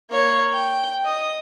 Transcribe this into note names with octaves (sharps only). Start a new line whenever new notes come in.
A#3 C#5
G5
D#5 D#6